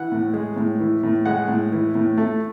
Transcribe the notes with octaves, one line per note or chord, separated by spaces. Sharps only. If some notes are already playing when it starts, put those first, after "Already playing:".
Already playing: E3 F#5
A2
G#3
A2
E3
A2
G#3 F#5
A2
E3
A2
A3